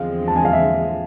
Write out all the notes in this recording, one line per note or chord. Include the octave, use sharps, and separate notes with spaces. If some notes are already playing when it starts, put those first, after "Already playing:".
Already playing: E2 D3 F3 G#3 C4 F5
A5
G#5
F5
E5